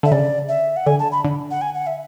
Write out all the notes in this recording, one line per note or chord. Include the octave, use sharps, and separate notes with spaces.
D3 E5
C#3 D5
E5
F#5
D3 G#5
A5
B5
D3
F#5
G#5
F#5
E5